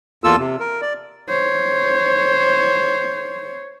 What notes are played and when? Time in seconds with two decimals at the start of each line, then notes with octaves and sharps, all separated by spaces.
0.24 E2 A#3 F4 A4 E6
0.39 C3
0.60 A#4
0.82 D5
1.29 C5 C#5